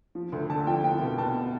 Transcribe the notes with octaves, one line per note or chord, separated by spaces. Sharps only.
F3
D2
D3 A5
F3 G5
C2 G5
B2
B2 A5